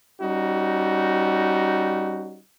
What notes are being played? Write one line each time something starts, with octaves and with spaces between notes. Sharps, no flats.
G3 C#4 D#4 F#4